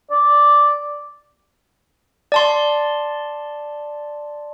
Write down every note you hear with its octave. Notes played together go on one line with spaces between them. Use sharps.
D5
D5 A5 C6